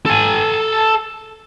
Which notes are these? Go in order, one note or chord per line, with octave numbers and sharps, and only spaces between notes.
A4 G#5